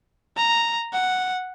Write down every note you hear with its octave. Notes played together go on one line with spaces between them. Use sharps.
A#5
F#5